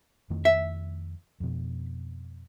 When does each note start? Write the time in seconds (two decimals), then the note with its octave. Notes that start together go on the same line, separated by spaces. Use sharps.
0.30 F2 D#3 A3
0.45 E5
1.40 F2 B2